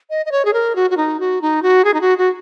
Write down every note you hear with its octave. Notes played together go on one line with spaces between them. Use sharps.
D#5
D#5
C#5
G#4
A#4
F#4
F#4
D#4
F#4
D#4
F#4
G#4
D#4
F#4
F#4